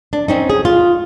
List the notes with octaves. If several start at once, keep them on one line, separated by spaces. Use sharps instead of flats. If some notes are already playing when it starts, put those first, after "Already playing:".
D4
C4 C#4 D#4
G#4
F4